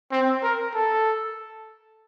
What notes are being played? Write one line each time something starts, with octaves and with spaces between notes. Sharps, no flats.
C4
A#4
A4